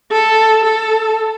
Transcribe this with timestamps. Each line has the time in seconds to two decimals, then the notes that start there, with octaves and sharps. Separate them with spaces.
0.12 A4
0.64 A4